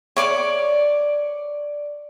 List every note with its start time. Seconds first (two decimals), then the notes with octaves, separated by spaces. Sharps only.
0.16 C#5 D5 D6